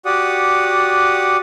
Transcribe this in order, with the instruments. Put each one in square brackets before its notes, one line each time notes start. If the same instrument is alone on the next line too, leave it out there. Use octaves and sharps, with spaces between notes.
[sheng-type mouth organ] F#4 G4 D5 F#5 D#6